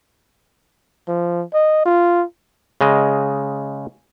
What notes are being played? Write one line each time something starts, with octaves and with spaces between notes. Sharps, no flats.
F3
D#5
F4
C#3 G#3 D#5